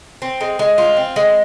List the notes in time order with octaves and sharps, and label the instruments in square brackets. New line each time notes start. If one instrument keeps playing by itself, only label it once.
[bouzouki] C4
G#3
G#3
F4
C4
G#3